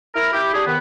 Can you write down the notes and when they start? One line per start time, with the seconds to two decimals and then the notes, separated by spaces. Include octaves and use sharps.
0.14 E4 A#4
0.33 E4 G4
0.53 D4 G4 G#4
0.65 C3 D#3 B3